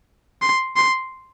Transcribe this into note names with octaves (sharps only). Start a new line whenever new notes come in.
C6
C6